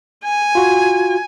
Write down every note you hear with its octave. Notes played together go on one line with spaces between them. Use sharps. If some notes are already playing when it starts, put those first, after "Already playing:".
G#5
F4 F#4